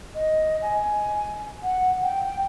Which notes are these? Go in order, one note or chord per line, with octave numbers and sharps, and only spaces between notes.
D#5
G#5
F#5
G5